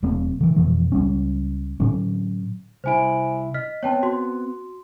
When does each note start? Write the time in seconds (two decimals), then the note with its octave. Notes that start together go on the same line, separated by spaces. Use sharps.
0.03 E1 F#3 A3 C4
0.41 D3 E3
0.56 F2 B2 E3 F3
0.92 C#2 G3 C#4
1.80 A2 D3 F#3 C#4
2.84 C2 E4 C5 G#5 D7
3.54 D#5 F6 B6
3.83 B3 C4 C#5 G5 A5
4.03 F#4 C6